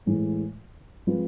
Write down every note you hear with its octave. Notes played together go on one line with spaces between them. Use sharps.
A2 E3 G#3
F3 G#3 C4 F4 B4